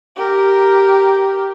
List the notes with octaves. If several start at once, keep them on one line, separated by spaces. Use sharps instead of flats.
G4 A#4